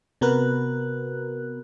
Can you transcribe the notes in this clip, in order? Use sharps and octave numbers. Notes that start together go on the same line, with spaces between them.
C3 B3 F#4 A#4 B4 F#6